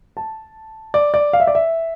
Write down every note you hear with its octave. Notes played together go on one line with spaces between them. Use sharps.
A5
D5
D5
F5
E5
D5
E5